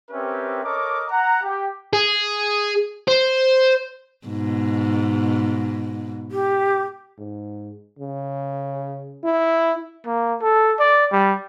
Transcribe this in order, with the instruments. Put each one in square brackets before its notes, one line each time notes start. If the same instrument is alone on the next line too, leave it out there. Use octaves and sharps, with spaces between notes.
[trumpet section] C4 C#4 G4 A#4 B4 E5
A4 A#4 C#5 D#5 D6
F#5 A#5
G4
[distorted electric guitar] G#4
C5
[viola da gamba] G#2 B2
[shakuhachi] G4
[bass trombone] G#2
C#3
E4
[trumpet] A#3
A4
D5
G3